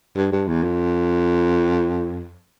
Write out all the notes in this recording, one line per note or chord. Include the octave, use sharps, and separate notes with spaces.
G2
G2
E2
F2